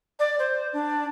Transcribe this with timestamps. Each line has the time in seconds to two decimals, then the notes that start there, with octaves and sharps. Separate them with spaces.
0.19 D5
0.39 C5
0.73 D4